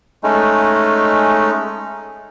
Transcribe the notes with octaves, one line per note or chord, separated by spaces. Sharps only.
G#3 A3 C#4 D#4